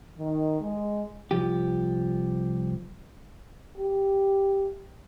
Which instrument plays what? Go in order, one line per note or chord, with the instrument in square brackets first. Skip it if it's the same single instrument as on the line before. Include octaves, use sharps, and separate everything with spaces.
[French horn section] D#3
G#3
[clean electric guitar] C2 F3 G4
[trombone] G4